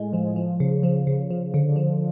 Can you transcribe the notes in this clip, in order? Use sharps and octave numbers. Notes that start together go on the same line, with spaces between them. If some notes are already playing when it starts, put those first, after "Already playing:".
Already playing: A2 G#3
F3
F3
C#3
F3
C#3
F3
D3
F3